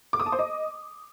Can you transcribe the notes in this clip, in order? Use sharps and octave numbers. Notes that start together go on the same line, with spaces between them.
D6
D#6
A5
C5
D#5